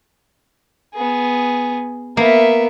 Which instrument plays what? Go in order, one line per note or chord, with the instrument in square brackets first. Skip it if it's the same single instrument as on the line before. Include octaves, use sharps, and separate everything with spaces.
[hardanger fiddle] B3 G#4
[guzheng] A#3 [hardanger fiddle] B3 E5